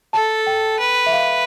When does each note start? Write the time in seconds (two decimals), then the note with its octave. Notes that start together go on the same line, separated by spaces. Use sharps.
0.13 A4 A5
0.47 G5
0.79 B4
1.06 E5
1.13 F5